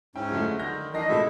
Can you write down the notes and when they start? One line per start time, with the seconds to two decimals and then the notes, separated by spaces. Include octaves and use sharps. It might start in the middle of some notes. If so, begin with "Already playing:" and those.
0.16 G#2 C#4 E4 G5
0.31 F2 D3 F#3 G#3 A3
0.59 D3 D#3 F6 G6 A#6
0.94 D#3 E3 D4 A#4 D#5 A#6 C7
1.09 B2 G#3 E4 F#4 A4 E5